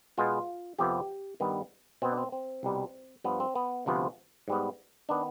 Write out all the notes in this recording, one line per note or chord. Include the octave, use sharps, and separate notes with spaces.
B2 G#3 B3 F4
F2 C3 F3 B3 G4
G2 D#3 G3 B3
B2 B3 C4
D4
C4
C4
C2 B2 G3
G2 F3 B3
C4
B3
D2 C3 F3 B3
G#2 G3 B3
D#3 B3 D4